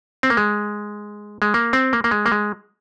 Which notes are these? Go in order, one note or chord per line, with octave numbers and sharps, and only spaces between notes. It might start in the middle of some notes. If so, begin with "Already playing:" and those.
C4
A#3
G#3
G#3
A#3
C4
A#3
A#3
G#3
A#3
G#3